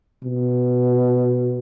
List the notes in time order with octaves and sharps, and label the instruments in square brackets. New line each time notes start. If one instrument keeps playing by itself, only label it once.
[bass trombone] B2